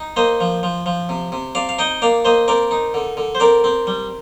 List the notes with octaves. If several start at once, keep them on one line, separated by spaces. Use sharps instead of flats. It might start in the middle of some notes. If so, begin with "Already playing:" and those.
Already playing: D#4
A#3 C5 D#5
F3
F3
F3
C3
C3
C3 D5 F5
F5
D#4 D#5 G5
A#3 D5 F5
A#3 C5 D#5
C4 A#4 D5
D#4
D3
D3
C5
C4 A#4 D5
C4
G3